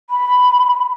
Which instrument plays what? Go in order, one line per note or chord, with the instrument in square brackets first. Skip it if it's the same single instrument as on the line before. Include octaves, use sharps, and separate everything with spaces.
[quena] B5